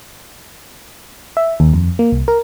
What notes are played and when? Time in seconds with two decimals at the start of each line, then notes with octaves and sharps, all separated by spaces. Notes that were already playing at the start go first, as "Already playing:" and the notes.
1.37 E5
1.60 D#2
1.74 F2
1.99 A#3
2.12 C2
2.28 A#4